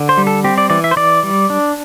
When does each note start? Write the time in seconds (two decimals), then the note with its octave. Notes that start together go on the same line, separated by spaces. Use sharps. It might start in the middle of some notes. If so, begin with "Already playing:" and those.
Already playing: D3
0.09 C5
0.18 G3
0.27 A4
0.44 C4 G4
0.58 D5
0.70 E3 D5
0.84 E5
0.91 C5
0.96 E3 D5
1.23 G3
1.50 D4